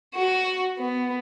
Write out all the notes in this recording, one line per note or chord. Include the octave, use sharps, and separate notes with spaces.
F#4
B3